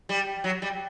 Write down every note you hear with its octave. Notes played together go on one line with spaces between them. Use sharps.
G3
F#3
G3